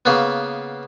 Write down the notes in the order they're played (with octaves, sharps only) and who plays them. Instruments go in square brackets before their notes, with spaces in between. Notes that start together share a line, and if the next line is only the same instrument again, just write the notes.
[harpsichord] C#3 A#3 B3